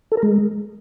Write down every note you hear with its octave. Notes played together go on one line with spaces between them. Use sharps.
A4
A#4
G#3